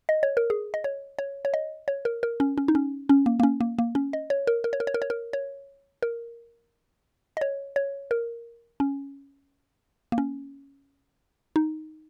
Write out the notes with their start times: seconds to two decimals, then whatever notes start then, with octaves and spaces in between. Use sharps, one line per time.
0.09 D#5
0.23 C#5
0.37 A#4
0.50 G#4
0.74 D#5
0.84 C#5
1.19 C#5
1.45 C#5
1.54 D#5
1.88 C#5
2.05 A#4
2.23 A#4
2.40 C#4
2.58 C#4
2.68 D#4
2.75 C#4
3.09 C#4
3.26 A#3
3.40 A#3
3.43 C#4
3.61 A#3
3.79 A#3
3.95 C#4
4.13 D#5
4.30 C#5
4.47 A#4
4.64 A#4
4.73 C#5
4.80 A#4
4.87 C#5
4.94 A#4
5.02 C#5
5.10 A#4
5.33 C#5
6.03 A#4
7.37 D#5
7.41 C#5
7.76 C#5
8.11 A#4
8.80 C#4
10.12 A#3
10.18 C#4
11.56 D#4